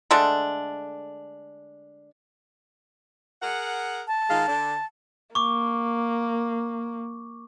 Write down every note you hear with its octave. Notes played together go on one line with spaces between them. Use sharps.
D3 G#3 A3 D4
G#4 A#4 F#5
A5
D#3 G#3 F5
D3 D4
A#3 C#6 D6